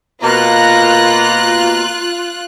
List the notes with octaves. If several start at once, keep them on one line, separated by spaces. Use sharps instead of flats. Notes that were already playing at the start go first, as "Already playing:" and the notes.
B2 A#3 F4 A#5 F#6